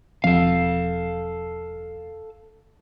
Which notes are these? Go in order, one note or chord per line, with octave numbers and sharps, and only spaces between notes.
E1 F3 C4 A4 F5